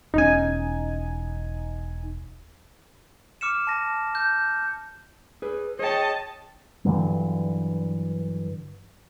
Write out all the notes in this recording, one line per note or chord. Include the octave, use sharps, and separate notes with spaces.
E1 C#4 D#4 G#5
D6 F6 C#7 E7
A5 A#6
G6
G#4 B4
G#4 C#5 D#5 G5 A5
G2 D3 E3 F#3